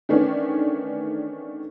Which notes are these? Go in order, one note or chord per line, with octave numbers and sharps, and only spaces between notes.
D#3 E3 A3 B3 C#4 D4